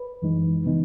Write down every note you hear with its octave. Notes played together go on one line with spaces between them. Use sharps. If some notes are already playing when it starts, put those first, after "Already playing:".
Already playing: B4
F#2 E3 G#3 D#4
C#3 E3 B3 D#4